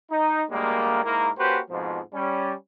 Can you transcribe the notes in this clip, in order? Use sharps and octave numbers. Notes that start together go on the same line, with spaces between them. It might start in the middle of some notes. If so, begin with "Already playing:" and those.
D#4
D2 G3 G#3 A#3
G#2 A#3 E4 A#4
A#3 C#4 F#4 G4 B4 C5
F2 G#2 B2 F3
G3 C#4